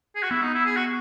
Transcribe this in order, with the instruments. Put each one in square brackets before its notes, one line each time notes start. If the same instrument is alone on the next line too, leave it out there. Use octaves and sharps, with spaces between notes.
[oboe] G#4
F#4
[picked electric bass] B3 [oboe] E4
[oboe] D#4
E4
G#4
F#4